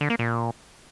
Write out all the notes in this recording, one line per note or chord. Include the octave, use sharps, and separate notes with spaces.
D3
A#3
A#2